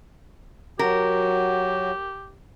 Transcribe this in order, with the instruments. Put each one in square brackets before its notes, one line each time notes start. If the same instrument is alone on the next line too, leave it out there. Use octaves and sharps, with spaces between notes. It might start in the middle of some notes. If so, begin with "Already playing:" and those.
[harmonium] F#3 F#4 [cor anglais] G4 [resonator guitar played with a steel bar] A#4